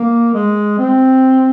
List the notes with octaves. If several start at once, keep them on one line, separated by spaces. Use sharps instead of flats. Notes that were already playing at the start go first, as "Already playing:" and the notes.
Already playing: A#3
G#3
C4